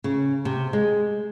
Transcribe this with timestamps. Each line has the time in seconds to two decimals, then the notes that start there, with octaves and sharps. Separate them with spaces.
0.04 C#3
0.45 C3
0.73 G#3